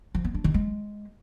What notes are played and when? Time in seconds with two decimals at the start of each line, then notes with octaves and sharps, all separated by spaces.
0.15 F3
0.24 B3
0.34 D4
0.44 D#3
0.54 G#3